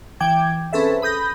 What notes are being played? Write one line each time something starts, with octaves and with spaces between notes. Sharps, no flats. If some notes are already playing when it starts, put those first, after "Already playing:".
E3 G5 D6 G#6
C4 C#4 G#4 A4 B4 E5
B5 D#6 G6 A#6